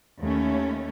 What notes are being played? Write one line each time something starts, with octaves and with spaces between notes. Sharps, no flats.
D#2 A3 C#4